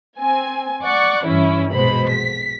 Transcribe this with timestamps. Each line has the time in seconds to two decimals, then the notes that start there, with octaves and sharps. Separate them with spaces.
0.18 C4 G#5
0.82 D5 F#5 C#6
1.25 G2 E3 C#4 E4
1.73 A#1 B2 G#3 C5 B5
2.09 B6